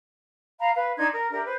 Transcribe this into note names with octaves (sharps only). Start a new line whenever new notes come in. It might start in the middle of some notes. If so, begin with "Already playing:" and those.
F5 A#5 B5
B4 F5
D4 D#4 C6 G#6
A#4
D4 G4 A#4 E5
B4 C5